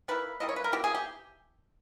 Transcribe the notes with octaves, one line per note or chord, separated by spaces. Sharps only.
G3 A#3 E4 B4
G3 A#3 E4 D#5
C#5
B4
A#4
B2 A#3 E4 G4
G#4
G4